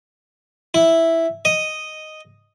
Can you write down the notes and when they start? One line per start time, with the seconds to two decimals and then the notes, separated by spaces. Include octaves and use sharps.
0.74 E4
1.45 D#5